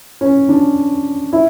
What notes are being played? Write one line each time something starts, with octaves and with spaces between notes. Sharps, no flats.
C#4
D4
E4